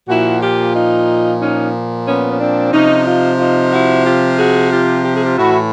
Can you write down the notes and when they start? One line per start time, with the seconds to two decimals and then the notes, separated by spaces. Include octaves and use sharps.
0.08 A#2 F3 E4 F#4
0.41 F4 G4
0.74 D#4 F4
1.41 C#4 D#4
2.07 B3 C#4
2.31 C#4
2.40 C4 D4
2.73 C3 F3 C#4 D#4
3.06 D#4 F4
3.39 D#4 F4
3.72 E4 F#4
4.05 F4 G4
4.39 F#4 G#4
4.72 F4 G4
5.05 G4
5.15 G#4
5.25 F4 G4
5.38 A2 E3 E4 F#4